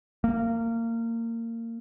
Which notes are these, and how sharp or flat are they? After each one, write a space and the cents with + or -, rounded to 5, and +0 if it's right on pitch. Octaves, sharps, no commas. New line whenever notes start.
A#3 -25